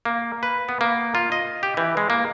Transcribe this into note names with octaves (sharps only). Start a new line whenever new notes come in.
A#3
B4
B3
A#3
F4
D#5
G4
E3
G#3
A#3